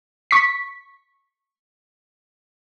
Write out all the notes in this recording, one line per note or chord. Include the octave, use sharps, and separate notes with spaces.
C#6 B6